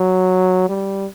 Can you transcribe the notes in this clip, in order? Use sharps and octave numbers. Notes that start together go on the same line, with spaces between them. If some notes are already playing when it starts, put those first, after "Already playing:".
Already playing: F#3
G3